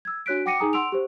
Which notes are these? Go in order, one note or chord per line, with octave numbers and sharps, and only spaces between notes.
E6 G#6
D4 F#4 C#5 F#6 B6 D7
F#5 G5 D6 A#6 C#7 D#7
D#4 G#4 G#5 A#5 D#6
F#5 C6 E6 D7 F7
G4 C5